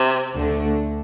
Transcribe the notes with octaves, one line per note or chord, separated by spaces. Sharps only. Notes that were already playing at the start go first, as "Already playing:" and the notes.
Already playing: C3
D2 D3 A3 D4